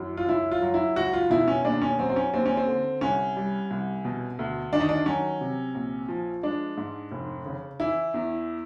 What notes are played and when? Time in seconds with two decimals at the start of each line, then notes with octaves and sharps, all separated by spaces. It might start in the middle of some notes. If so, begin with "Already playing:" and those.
Already playing: F#2 E3
0.17 F4
0.28 C#2 E4
0.51 F4
0.62 F#3
0.74 E4
0.96 C#2 F#4
1.14 F4
1.30 B2 E4
1.48 C#4
1.65 D#2 D4
1.82 C#4
1.99 F#3 C4
2.09 C4
2.16 C#4
2.34 D#2 C4
2.46 C#4
2.57 C4
2.67 D3
3.01 C2 C#4
3.36 G3
3.71 C2
4.05 B2
4.39 D2
4.72 D#3 D4
4.80 D#4
4.89 D4
5.06 F#3 C#4
5.41 C3
5.74 A#1
6.08 F3
6.43 G#3 D4
6.77 G#2
7.11 F1
7.46 C#3
7.80 E3 E4
8.14 E2